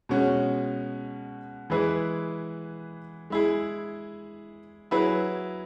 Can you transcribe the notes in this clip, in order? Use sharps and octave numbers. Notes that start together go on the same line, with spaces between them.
B2 G#3 C#4 F#4
E3 G#3 E4 G#4 B4
G#3 E4 G#4
F#3 E4 G#4 B4